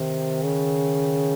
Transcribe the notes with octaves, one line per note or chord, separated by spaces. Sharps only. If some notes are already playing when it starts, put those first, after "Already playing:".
Already playing: C3 D#3
C#3